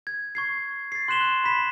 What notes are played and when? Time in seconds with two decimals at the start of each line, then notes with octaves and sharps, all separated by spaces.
0.07 G#6
0.35 C#6 G#6 C7
0.92 A6 C7
1.08 C6 F#6 B6 E7 F#7 G7
1.21 F#6
1.44 B5 C6 B6 E7 F#7